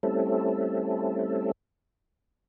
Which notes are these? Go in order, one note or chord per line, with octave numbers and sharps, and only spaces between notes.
G3 A3 C4 C#4 E4 A4